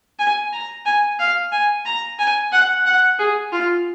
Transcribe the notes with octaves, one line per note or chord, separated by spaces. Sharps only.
G#5
A#5
G#5
F5
G#5
A#5
G#5
F#5
F#5
G#4
F4